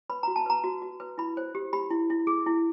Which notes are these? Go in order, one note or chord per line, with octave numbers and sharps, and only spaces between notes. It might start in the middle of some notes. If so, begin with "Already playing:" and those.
B4 B5
F#4 A#5
A5
B4 A#5
F#4
F#4
B4
E4 B5
C5
G4
G4 B5
E4
E4
G#4
E4